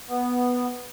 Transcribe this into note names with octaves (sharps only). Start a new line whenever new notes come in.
B3